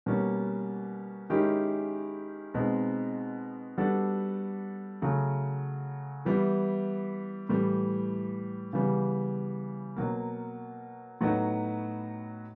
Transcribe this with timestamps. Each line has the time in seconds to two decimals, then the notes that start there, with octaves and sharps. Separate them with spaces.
0.06 B2 G3 A#3 C#4
1.30 D#3 G#3 C#4 E4 G4
2.54 B2 G#3 C4 D#4
3.78 G3 B3 D4 F#4 A4
5.02 C#3 F#3 A3
6.25 E3 G3 B3 E4
7.49 A2 E3 G3
8.73 C#3 E3 G3 B3
9.96 B2 F#3 A#3
11.21 A2 F#3 B3 D#4 F#4